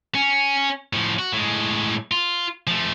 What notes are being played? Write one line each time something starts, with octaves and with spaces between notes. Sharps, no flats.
C#4
A2 F3
F#4
A2 G#3
F4
F3 A3